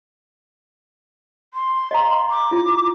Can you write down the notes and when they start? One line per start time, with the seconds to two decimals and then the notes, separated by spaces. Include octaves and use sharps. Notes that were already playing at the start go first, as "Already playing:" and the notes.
1.54 C6
1.91 D#5 F5 A#5
2.30 D6
2.51 E4 F4